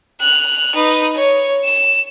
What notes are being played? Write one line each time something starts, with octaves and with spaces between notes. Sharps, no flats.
F#6 F7
D#4 B4
C#5
E7